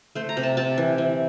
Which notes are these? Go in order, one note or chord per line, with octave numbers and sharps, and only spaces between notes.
A3 C5
A#5
C3
A5
C3 A5
E3
E3